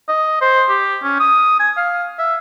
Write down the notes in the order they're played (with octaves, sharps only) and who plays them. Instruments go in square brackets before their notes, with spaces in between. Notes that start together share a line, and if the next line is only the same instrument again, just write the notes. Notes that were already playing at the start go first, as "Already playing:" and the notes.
[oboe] D#5
C5
G4
C#4
D#6
G#5
F5
E5